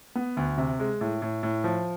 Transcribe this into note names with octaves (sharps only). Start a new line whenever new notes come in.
B3
D2
C3
G#3
A2
A2
A2
F3